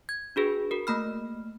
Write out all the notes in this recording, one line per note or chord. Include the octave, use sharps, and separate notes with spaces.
G#6
D4 F#4 G#4 B4
F#4 A#4
A3 A#3 B5 F6